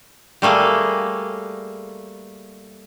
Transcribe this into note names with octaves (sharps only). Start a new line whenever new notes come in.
G3 A3 A#3 G#4